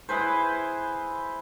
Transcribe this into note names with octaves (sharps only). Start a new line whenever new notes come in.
E4 G#4 B4 C5